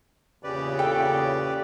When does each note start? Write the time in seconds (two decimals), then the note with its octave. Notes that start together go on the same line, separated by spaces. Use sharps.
0.44 E2 A#2 C#3 G4 B4 D5
0.79 A4 G5